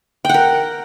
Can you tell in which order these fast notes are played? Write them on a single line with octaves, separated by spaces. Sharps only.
G5 F#5 A#4